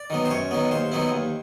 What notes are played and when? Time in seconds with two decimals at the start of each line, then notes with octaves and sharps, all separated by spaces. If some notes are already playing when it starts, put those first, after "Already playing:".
Already playing: D5
0.10 D#3 F#3 B3
0.25 C5
0.31 F#2 C#5
0.51 D#3 F#3 B3
0.71 D#2 C5
0.92 D#3 F#3 B3 E4
1.12 D#2